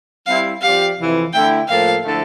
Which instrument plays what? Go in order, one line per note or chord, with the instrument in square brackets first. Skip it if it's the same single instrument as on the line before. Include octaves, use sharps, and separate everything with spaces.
[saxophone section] G3 C4 E4 [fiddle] F5
[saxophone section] F3 C4 G4 D5 [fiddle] F5
[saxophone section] F2 C3 E3
[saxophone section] D3 A3 E4 [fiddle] G5
[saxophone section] A2 F3 A#3 F4 A4 [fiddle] F5
[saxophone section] D3 F3 A3 E4 A4